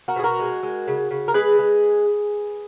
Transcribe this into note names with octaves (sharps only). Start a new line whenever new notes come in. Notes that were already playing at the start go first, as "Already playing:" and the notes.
F#4 A#4
B2 G#4
F#4 A#4
G#3
G#3
C#3
C#3
A#4
G#3 G#4 B4
G#3